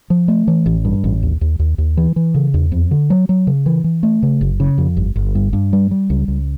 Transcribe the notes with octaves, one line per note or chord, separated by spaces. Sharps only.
F3
A3
E3
A1
G2
A1
D#2
D#2
D#2
D#2
E3
E3
C#3
E2
F2
D3
F#3
F#3
C#3
E3
E3
A3
C#3
F#1
C#3
F2
G1
G1
G2
G2
G3
G3
C#2
C#2